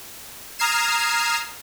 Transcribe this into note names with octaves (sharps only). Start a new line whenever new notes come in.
A#5 D#6 F6 G#6 C7 E7